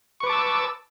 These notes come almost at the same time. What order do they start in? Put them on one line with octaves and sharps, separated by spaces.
C#6 B4 D6 A5 E6